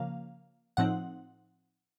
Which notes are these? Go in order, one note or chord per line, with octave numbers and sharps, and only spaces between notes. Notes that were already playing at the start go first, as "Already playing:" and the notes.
Already playing: C#3 F3 A#3 F5
A2 F3 C4 D#4 F#5